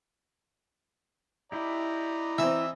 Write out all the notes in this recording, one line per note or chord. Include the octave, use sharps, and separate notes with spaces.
E4 G4 D5 D#5 A#5
E3 C4 E5